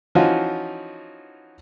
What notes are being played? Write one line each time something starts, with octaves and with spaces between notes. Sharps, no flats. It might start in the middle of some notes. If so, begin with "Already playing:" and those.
E3 F3 C#4 D#4 F4 F#4